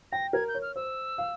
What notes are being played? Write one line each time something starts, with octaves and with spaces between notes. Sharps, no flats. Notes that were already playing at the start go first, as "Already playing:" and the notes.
G5 A#6
A#4 G#6
G6
C#5
F6
C5 E6
F5